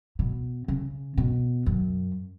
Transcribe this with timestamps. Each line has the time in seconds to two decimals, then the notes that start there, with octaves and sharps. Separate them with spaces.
0.19 B2
0.68 C#3
1.18 B2
1.66 F#2